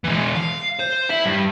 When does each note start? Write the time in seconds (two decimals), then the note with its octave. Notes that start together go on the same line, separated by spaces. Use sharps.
0.04 E3 G#3
0.35 F5
0.79 C5
1.09 E4 E5
1.25 G2